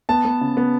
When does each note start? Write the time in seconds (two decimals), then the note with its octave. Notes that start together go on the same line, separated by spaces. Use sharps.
0.09 B3 A5
0.25 B3
0.41 C#3
0.57 B3